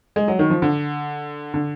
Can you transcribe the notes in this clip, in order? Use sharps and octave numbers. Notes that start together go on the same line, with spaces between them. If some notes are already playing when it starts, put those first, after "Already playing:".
G#3
F#3
D#3
F3
D3
D3